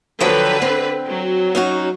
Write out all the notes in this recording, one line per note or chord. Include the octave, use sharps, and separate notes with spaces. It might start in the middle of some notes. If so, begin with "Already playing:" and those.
D3 F3 F#3 B4 G5
C4
F#3
C#4 D#4 F#4